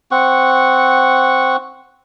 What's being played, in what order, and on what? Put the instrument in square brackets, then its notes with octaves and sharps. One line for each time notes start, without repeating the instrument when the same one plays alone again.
[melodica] C4 F#5 C#6